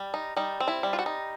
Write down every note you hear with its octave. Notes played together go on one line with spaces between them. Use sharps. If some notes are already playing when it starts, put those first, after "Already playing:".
Already playing: G3
D#4
G3 D#4
C4
E4
G3
F4
F#4
D#4